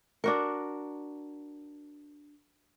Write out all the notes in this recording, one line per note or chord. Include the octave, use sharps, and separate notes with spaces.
D4 F#4 A#4